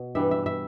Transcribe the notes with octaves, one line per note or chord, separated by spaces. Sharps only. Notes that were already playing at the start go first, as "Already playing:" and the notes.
Already playing: B2
G2 E3 G3 E5
E5
E5